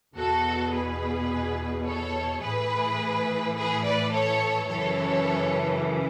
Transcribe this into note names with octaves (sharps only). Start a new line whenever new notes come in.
E2 B2 F#4 A4
G#4 B4
A4 C#5
A2 E3 G#4 B4
G#4 B4
B4 D5
A4 C#5
F#2 C#3 E3 A4 C#5